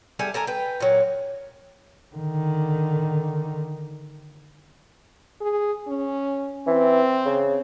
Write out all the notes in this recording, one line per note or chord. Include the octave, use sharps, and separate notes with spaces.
G3 G#4 A4 E5
A4 A#4 G#5 A#5
B4 G5
A#2 F#3
D3 D#3
G#4
C#4
E3 C4
C#3